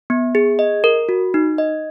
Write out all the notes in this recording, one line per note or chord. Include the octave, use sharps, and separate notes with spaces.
B3
G#4
D#5
A#4
F#4
D#4
D#5